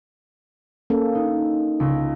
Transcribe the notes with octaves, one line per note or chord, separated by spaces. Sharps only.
A#3 C#4 A4
D#4
C#2